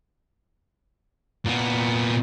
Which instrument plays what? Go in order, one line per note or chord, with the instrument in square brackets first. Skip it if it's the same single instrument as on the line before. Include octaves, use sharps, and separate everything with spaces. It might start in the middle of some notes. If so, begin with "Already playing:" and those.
[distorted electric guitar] A#2 B3